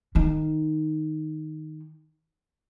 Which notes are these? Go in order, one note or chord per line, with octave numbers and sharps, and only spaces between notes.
D#3 D#4